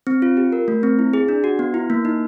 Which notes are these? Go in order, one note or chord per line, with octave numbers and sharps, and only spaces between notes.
C4
F4
G4
A#4
A3
C4
E4
G#4
D4
F#4
B3
E4
A#3
D#4